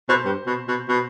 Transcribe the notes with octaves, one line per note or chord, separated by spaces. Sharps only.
B2 C5
G2
B2
B2
B2